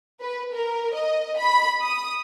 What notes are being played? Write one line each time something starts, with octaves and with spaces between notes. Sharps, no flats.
B4
A#4
D#5
B5
D#6